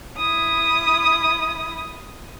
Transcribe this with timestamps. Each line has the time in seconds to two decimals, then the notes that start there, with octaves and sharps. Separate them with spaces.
0.18 E4 D#6